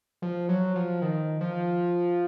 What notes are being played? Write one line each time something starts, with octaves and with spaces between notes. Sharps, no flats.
F3
F#3
F3
D#3
F3